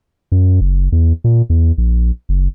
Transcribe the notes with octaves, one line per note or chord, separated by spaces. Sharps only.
F#2
F#1
E2
A#2
E2
A#1
F#1